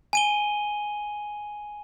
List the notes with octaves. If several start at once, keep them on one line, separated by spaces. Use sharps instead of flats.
G#5 D#7 G7